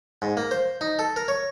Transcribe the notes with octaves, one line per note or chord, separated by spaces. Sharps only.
G#2
A#3
C5
D#4
A4
A#4
C#5